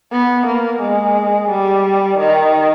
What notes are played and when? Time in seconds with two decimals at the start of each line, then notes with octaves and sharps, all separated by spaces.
0.13 B3
0.47 A#3
0.81 G#3
1.50 G3
2.19 D#3